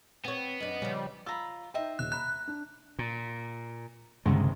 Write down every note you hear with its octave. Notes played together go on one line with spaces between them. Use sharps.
B3 C4 C#5
F#2 D4 D#5
C#3 F3 G3
F4 A#5 B5 E6
D#4 C5 D#5 E5 G5
D#1 F#6
A#5 B5 F#6
D4
A#2
G1 C#2 C3 D#3 G#3